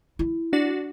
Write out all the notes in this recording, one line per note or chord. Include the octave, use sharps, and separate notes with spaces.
E4
D4 F#4 D5